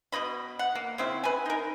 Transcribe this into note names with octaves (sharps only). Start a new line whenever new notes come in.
B2 D#4 D#5 B5
F#5
A#3
C#3 C4 E4
B4 G#5
D#4 A#4